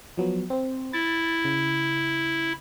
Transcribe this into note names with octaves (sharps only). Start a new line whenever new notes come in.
F3 F#3 B3
C4 C5
E4 A6
C#3